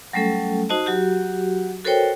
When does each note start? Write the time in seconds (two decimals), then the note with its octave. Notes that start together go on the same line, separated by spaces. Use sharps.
0.13 F#3 G3 A3 C#4 A4
0.69 D#4 F#4 C5 D#5 A5
0.86 F#3 F#4 G4
1.85 F#4 A4 A#4 C5 C#5 G5